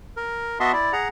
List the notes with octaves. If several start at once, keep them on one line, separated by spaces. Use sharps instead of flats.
A#4
B3 F#4 D#5 E5 A5 C6
E4 D5
G#4 F#5 A#5